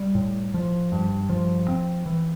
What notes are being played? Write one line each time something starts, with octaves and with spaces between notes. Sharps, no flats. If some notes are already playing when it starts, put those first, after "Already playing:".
Already playing: G3
A2
F3
G2
F3
C4
E3